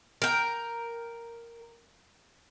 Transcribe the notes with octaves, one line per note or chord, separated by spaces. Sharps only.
A#4 G5